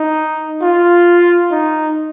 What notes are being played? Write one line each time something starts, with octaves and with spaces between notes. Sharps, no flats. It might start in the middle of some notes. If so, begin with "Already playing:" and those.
Already playing: D#4
F4
D#4